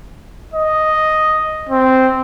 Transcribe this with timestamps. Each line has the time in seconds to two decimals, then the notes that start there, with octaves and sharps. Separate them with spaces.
0.54 D#5
1.69 C4